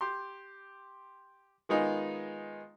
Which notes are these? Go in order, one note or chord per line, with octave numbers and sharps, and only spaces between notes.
G4 C6
D#3 G#3 B3 D#4 F4 G#4